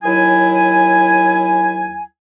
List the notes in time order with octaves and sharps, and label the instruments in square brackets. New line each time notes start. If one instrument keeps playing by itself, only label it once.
[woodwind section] D#2 F#3 E4 G#5